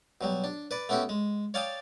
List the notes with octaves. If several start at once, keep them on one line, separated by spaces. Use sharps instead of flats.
B2 F#3 G3
D4
B4 D5
A3 B3 C#4 E4 F#4 G4
G#3
C#5 D5 F5 G5 A5 D#6